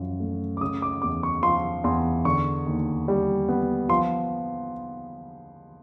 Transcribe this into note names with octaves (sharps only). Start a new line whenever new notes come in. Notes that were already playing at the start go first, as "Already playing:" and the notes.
Already playing: F#2 F3
A3
D6
C#3 D#6
D6
E2 D6
C#6
F3 C6
E2 C6
D3 C#6
D#2
G3
B3
F3 C6